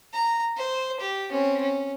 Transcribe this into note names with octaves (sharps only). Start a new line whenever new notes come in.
A#5
C5
G4
C4 C#4
C#4